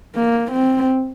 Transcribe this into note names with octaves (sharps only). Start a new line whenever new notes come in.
A#3
C4